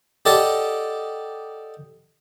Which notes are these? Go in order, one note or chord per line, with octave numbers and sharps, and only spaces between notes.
G4 A4 D5 D#5 F#5 A5